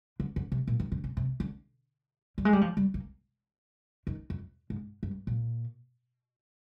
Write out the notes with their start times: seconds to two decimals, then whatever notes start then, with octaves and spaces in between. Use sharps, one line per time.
0.20 D3
0.36 D3
0.52 C3
0.68 A#2
0.80 D#3
0.92 D3
1.04 C3
1.17 C3
1.40 D3
2.38 G3
2.45 G#3
2.53 G3
2.61 F3
2.77 G3
2.94 A#3
4.07 D#3
4.30 F2
4.70 G#2
5.03 G2
5.27 A#2